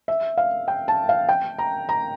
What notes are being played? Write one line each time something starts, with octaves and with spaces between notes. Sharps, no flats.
E5
F5
G5
A5
F5
G5
A#5
A#5